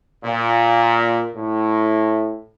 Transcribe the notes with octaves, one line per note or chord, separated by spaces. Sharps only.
A#2
A2